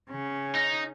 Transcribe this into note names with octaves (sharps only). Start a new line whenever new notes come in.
C#3 C#4
D#4